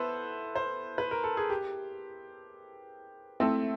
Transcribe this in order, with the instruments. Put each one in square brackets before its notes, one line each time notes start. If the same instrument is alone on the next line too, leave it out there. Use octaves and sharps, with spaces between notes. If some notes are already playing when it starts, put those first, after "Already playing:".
Already playing: [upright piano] B3 E4 A4 [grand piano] B4 C5
[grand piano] C5
B4
A#4
A4
G#4
G4
[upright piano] A3 C4 E4 A4